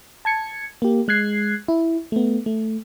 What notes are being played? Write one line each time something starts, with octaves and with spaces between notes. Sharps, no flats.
A5 G#6 C#7
A#3 G4
G#3 F#6 G#6 C7
E4
A3 B3
A3